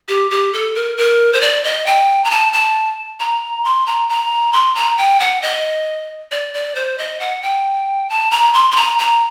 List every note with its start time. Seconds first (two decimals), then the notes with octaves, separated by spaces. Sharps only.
0.08 G4
0.30 G4
0.53 A4
0.75 A#4
0.97 A#4
1.33 C5
1.41 D5
1.64 D#5
1.86 G5
2.24 A#5
2.30 A5
2.53 A5
3.20 A#5
3.65 C6
3.86 A#5
4.09 A#5
4.53 C6
4.75 A#5
4.98 G5
5.20 F#5
5.42 D#5
6.31 D5
6.54 D5
6.75 C5
6.98 D#5
7.20 F#5
7.42 G5
8.09 A5
8.31 A#5
8.54 C6
8.71 C6
8.76 A#5
8.99 A#5